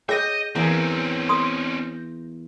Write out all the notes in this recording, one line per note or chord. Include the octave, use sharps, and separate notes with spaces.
G#4 C#5 D#5 E5 G5 G6 A#6
E2 A#3 C4 C#4 B5
C6 D#6